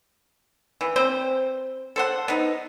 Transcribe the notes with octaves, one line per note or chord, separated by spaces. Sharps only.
E3
C4 C5
A4 C5 F#5
B3 D#4